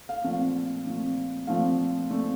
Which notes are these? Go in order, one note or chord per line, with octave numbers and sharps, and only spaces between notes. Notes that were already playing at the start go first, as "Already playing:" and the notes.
F5
A#2 F3 A3 C4 F5
A#2 F3 A3 C4
A#2 F3 A3 C4 F5
A#2 A3 C4